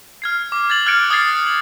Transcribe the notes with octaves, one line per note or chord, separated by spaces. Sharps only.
F6 G#6 C7
D6
G#6 A6 F#7
F6 F#6 G#6 A6 C#7 D7
D#6 F6 G#6 A6 C7 F#7
F#7